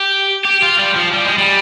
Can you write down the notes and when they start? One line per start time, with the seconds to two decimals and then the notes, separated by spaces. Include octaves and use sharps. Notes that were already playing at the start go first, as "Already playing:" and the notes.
Already playing: G4
0.45 G4
0.63 F4
0.79 G3
0.96 F3
1.13 G3
1.25 G#3
1.38 G3